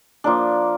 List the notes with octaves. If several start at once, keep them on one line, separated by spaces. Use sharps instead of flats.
F3 A#3 D4